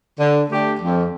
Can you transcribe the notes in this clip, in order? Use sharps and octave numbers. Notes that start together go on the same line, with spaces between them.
D3
A3 D4 G4
F2